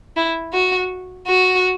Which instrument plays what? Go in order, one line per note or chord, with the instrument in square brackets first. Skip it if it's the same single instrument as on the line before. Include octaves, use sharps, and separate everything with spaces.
[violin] E4
F#4
F#4